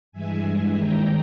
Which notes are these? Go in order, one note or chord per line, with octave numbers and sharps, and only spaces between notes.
G2 E3 G#3 E5 G#5
E5 G#5
D#2 D#3 G3 G5 A#5